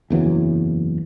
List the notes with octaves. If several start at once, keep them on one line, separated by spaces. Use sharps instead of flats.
F#1 E2 E3 F#3